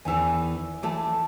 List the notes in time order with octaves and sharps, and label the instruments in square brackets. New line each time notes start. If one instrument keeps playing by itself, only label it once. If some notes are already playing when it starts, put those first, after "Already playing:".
[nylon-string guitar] E2 D#3 E3 [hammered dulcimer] E5 G#5
[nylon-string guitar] E3 A3 A4 [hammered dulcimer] D5 E5 A5